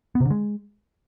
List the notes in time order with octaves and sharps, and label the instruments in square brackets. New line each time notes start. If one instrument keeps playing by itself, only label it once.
[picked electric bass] B3
C3
D3
G#3